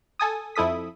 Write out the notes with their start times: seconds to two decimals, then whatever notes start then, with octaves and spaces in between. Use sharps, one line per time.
0.19 A4 G#5 D#6
0.56 F2 E4 A4 D#6 B6